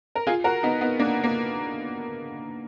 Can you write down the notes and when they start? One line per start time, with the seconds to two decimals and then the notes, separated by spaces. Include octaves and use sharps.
0.15 A#4
0.27 F4 G#4
0.44 F#4 A#4
0.63 B3 D#4
0.81 B3 D#4
0.99 A#3 D4
1.24 A#3